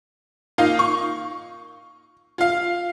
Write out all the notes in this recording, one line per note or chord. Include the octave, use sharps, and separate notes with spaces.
A#3 D#4 F4 F5
C#6
F4 F5